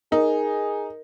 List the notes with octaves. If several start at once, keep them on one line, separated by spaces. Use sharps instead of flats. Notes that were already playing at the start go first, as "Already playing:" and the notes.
D#4 G#4 A#4